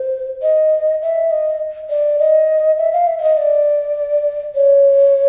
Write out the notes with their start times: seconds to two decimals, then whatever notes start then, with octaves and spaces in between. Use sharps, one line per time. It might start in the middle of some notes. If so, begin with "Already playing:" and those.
Already playing: C5
0.42 D#5
1.02 E5
1.31 D#5
1.90 D5
2.19 D#5
2.78 E5
2.93 F5
3.07 E5
3.18 E5
3.22 D#5
3.37 D5
4.55 C#5